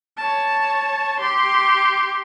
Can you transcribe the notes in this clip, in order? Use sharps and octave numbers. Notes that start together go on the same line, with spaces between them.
C#5 A5
G4 C6